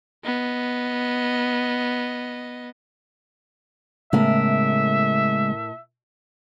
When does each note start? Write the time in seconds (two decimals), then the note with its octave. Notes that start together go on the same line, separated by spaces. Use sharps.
0.24 B3 D#5
4.13 A2 C#3 G#3 A3 B3 A#4 E5